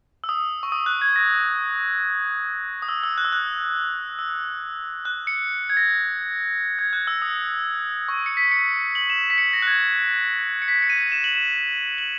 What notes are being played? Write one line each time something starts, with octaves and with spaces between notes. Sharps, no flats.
E6
D#6
C#6
D#6
F#6
G#6
A#6
D#6
E6
E6
F#6
E6
F#6
E6
F#6
C#7
G#6
A#6
G#6
F#6
E6
D#6
C#6
C#7
B6
C#7
F#7
E7
B6
C#7
A#6
F#6
G#6
C#7
B6
C#7
D#7
E7
F#7
E7
F#7